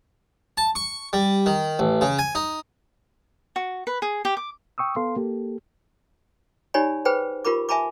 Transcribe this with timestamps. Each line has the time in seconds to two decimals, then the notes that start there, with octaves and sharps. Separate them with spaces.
0.58 A5
0.75 C#6
1.13 G3
1.46 D#3
1.79 A1
2.01 C#3
2.19 G#5
2.35 D#4
3.56 F#4
3.87 B4
4.02 G#4
4.25 G4
4.37 D6
4.78 G5 C#6 D#6 E6
4.96 B3 A4 F5 C6
5.16 A#3 G4 A4
6.74 D#4 G4 C#5 D5 G#5 B5
7.05 G#4 B4 C5 G5 B5
7.45 F4 G4 A#4 B5 D6
7.69 E5 G#5 A5 B5 D6